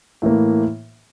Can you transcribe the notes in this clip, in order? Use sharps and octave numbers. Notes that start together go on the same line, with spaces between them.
A2 E3 A#3